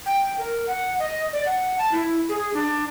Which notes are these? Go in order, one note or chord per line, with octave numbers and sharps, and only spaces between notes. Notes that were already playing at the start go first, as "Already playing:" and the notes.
G5
A#4
F#5
D#5
D5
F#5
A5
E4
G#4
D4